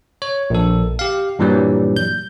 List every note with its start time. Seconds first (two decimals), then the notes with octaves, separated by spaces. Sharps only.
0.22 C#5
0.50 A#1 A4
0.99 G4 F5
1.39 G2 A#2 E3 F#3 G3
1.96 G6